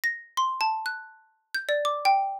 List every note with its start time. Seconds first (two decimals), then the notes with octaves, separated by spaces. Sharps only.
0.04 A#6
0.37 C6
0.61 A5
0.86 F#6
1.55 G6
1.69 D5
1.85 D6
2.05 G5